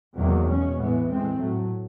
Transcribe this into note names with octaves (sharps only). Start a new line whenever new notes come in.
E2 C3 D#3 F#3 A#3
B2 G#3 C#4
A2 E3 G#3 B3
A2 E3 G#3 C4
A2 F#3 A3